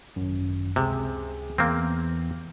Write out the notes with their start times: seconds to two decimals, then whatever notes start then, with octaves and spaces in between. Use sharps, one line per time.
0.16 G#1 F#2
0.76 C#2 C3 G#4
1.58 E2 A#3 C4